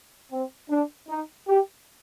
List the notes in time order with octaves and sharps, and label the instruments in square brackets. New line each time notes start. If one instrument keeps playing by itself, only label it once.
[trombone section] C4
D4
D#4
G4